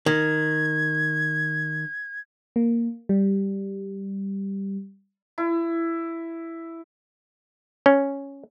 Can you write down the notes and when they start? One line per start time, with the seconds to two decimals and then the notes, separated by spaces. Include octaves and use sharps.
0.06 D#3 G#6
2.56 A#3
3.09 G3
5.38 E4
7.86 C#4